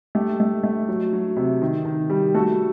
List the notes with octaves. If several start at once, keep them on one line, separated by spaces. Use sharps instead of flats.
A3 G4
A3
A3
F#3
F#3
C3
D#3
D#3
G3
A3 F#4 A4